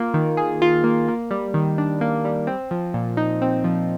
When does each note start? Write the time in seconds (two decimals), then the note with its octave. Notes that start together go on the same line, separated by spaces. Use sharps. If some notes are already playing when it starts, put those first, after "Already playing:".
Already playing: A#3 F4
0.14 D#3
0.37 G#4
0.62 F4
0.84 A#3
1.08 A#3
1.31 G3
1.54 D#3
1.78 D4
2.01 A#3
2.25 G3
2.47 C4
2.71 F3
2.94 A#2
3.17 D#4
3.42 C4
3.64 F3